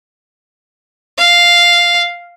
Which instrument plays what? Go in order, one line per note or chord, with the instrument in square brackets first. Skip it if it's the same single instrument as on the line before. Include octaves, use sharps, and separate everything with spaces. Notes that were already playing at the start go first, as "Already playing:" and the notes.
[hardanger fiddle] F5